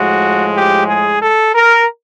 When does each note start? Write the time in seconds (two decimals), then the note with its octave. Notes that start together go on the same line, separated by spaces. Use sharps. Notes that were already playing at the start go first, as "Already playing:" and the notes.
Already playing: A2 F3 G#3 F#4
0.54 G4
0.86 G#4
1.20 A4
1.53 A#4